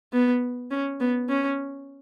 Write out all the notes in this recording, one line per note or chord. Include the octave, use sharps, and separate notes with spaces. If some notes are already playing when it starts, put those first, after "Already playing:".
B3
C#4
B3
C#4